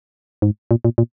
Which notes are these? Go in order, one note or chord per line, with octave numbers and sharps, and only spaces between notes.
G#2
A#2
A#2
A#2